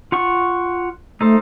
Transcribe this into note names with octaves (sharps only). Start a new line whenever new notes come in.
F4 F#5 C#6
A3 D#4 A4 C5